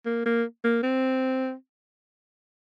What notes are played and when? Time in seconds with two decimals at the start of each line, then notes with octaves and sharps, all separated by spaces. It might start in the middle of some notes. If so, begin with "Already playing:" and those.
0.06 A#3
0.26 A#3
0.64 A#3
0.83 C4